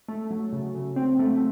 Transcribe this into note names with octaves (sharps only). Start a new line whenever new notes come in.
A3
F#3
C#3
C#3
C4
A3